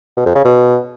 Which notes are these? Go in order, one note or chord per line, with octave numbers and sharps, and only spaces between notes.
B2
F2
C#3
B2